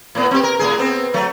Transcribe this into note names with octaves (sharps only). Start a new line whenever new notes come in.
A2 B3
C4 G4
A#4
A2 D#3 G#4
B3 C4
F#3 A3